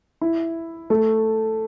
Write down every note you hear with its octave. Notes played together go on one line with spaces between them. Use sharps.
E4
A3